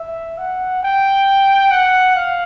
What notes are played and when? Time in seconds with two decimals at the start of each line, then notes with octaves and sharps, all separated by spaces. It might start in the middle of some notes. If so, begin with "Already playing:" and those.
Already playing: E5
0.38 F#5
0.83 G5
1.71 F#5
2.15 F5